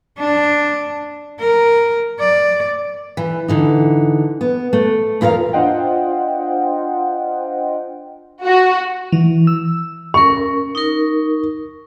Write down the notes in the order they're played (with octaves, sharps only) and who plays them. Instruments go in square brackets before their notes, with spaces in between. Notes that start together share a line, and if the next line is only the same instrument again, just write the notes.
[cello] D4
A#4
D5
[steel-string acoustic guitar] E3
D3 E3 D#4
B3
A3
E2 E4 F4 A#4 F5
[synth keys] D4 F4 C5 D#5 F#5 G5
[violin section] F#4
[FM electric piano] E3
E6
[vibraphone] C#4 A#4 [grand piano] C#6
[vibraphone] D#4 A#4